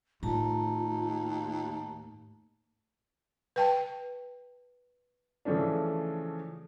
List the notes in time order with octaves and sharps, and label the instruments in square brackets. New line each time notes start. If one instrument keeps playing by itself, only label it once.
[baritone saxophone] D#2 [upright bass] A2 [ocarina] F4 [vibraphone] A5 A#5
[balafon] B4 G5 A5
[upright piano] C#3 E3 F3 A3 C#4 D4